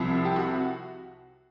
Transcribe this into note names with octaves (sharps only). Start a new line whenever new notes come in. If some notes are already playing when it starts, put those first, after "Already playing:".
Already playing: C2 C3 F3
G4
F#4